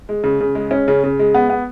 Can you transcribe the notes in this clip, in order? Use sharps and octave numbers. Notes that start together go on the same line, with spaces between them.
G#3
C#3
C#3
G#3
C#4
C#3
C#3
G#3
B3
B3